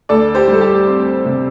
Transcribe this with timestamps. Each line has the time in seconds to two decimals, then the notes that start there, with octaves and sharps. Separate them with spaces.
0.09 D2 A4 D5
0.35 G4 C5
0.48 G3
0.53 A4
0.61 G4
0.87 C4
1.25 C3